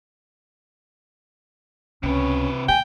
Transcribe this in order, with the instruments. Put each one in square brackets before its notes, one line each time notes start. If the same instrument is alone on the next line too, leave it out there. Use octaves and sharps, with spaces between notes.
[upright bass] C#2 [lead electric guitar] C3 B4 [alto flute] C#4
[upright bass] A#2 D3 [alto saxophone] G5 [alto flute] G#5